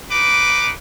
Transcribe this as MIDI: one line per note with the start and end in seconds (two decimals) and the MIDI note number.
0.10 0.71 63
0.10 0.71 71
0.10 0.71 86